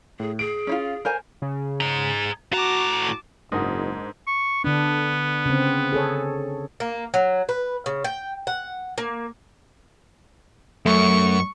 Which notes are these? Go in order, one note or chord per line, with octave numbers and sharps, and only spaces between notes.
A2 G#4
G#4 D7
C#4 E4 F4
A#4 C5 G#5
C#3
G#4 A#5
A2 F#4 A5 A#5 D6
F#1 G#2 D4 D#4 A#4 F#5 D#6
C#6
D3 B3 D4
C#3 C4
G#4 A4 C#5
A#3
F#3
B4
C#3
G5
F#5
A#3
F#2 A3 C#6